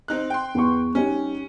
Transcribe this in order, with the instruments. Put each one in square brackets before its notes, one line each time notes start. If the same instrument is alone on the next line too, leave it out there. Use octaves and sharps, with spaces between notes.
[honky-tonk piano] C4 D#4 F#6
G5 C6
[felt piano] E2 B3 C#6
[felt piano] G3 D#4 G4 [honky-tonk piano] C#4